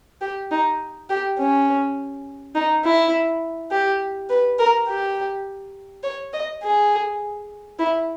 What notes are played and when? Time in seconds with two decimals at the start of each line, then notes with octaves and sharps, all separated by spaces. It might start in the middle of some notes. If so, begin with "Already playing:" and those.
0.21 G4
0.51 D#4
1.10 G4
1.38 C#4
2.55 D#4
2.84 E4
3.72 G4
4.30 B4
4.59 A#4
4.88 G4
6.04 C#5
6.33 D#5
6.63 G#4
7.79 E4